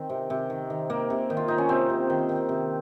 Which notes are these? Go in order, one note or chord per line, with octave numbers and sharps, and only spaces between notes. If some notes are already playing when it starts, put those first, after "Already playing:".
Already playing: D#3 C4
C3
C3
D#3
D#3
C3 A#3
C3
D#3
F4
D#3 D#4
C#4
C3 C4
C3
D#3
D#3
C3